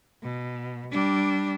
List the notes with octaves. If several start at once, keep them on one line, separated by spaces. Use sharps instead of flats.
B2
G3 D4